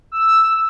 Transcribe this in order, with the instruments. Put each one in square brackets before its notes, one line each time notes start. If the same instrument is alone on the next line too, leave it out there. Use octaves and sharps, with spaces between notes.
[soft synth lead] E6